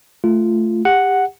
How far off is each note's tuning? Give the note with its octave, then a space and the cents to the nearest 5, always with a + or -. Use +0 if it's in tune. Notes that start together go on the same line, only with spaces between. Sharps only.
A3 +0 F4 -15
G4 +25 F#5 +0